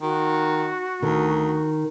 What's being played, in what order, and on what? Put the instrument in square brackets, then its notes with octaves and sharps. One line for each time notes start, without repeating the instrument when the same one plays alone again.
[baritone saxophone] D#3 [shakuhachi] F#4
[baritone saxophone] D2 [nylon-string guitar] D#3